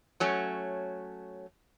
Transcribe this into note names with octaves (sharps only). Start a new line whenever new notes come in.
F#3 A3 C#4